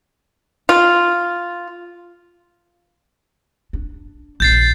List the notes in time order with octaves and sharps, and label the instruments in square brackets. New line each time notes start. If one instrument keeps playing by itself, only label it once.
[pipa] F4
[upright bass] D4
[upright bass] A#1 D#2 [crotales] G6 A6 C7